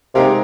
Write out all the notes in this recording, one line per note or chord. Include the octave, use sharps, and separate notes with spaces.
C3 G#3 D#4 G4 A#4 F5